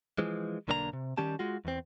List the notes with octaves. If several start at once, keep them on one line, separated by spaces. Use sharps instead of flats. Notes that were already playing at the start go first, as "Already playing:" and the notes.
E3 F3 G#3
B1 D3 A#3 D4 A4 A#5
C3
D#3 G3 C#4 G4 A5
G#3 F4 F#4
E2 C4